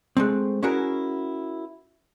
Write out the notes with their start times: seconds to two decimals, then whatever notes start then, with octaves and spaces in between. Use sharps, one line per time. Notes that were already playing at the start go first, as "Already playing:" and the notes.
0.17 G#3 A3 C4
0.63 C#4 E4 F#4 G#4 A#4